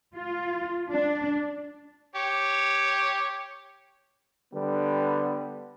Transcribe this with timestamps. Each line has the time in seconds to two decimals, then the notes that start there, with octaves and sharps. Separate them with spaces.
0.14 F4
0.90 D4
2.15 G4 C#5
4.54 D3 G3 B3